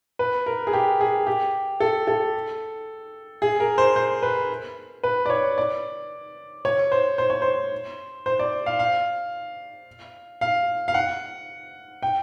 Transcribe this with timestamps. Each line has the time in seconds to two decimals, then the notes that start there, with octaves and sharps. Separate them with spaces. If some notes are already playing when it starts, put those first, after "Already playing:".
0.19 B4
0.46 A#4
0.67 G#4
0.73 G4
1.01 G#4
1.27 G4
1.80 A4
2.08 A4
3.42 G#4
3.60 A#4
3.78 C5
3.96 C5
4.23 B4
5.03 B4
5.26 D5
5.30 C#5
5.58 D5
6.65 C#5
6.92 C5
7.18 C5
7.30 C#5
7.42 C5
8.26 C5
8.39 D5
8.66 F5
8.79 F5
10.41 F5
10.88 F5
10.94 F#5
12.02 G5